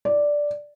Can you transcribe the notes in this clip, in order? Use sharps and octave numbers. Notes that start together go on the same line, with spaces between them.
D5